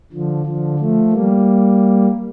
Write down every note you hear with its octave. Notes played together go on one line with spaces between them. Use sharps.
D3 F3
D3 F3
F3 A3
G3 A#3